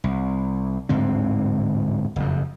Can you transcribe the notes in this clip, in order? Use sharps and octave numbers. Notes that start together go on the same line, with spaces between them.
C2
D1 G#2 D3 C4
F#1 F2